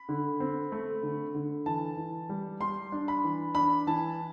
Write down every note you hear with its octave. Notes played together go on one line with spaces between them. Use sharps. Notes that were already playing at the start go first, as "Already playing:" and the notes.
Already playing: B5
D3
C4
A3
D3
D3
E3 A5
E3
G3
G3 C6
D4
B5
E3
D4 B5
E3 A5